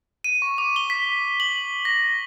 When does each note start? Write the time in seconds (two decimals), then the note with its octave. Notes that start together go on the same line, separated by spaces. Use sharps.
0.24 D#7
0.42 C#6
0.58 D6
0.76 G7
0.90 B6
1.40 F#7
1.85 A#6